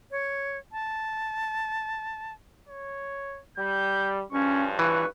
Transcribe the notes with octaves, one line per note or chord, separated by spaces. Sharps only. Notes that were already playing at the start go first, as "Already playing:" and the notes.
C#5
A5
C#5
G3 G6
G2 C#3 F3 C#4 C#6
E3 B4 C#6